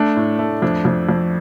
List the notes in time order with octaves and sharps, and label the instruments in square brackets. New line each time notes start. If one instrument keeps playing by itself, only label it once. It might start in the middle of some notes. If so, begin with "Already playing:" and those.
Already playing: [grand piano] A3 D4
A2
A3
F2 D4
F2
F2